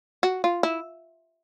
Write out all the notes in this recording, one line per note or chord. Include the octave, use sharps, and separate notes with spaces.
F#4
F4
E4